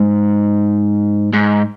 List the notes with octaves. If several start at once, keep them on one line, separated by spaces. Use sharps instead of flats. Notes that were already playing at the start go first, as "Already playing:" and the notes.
Already playing: G#2
G#2